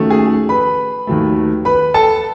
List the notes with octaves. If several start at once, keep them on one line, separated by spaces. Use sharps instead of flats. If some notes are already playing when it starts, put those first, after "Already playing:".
Already playing: D#2 D#3 F#3 A3 C#4
G#4 G#5
B4 B5
D#2 D#3 F#3 A3
B4 B5
A4 A5